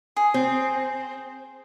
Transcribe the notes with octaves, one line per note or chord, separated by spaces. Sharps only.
G#4
C4